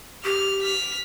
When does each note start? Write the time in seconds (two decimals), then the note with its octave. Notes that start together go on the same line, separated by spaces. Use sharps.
0.24 G4 F6
0.62 F6 B6